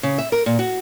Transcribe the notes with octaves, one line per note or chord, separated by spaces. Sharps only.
C#3
E5
A#4
A#2
F#4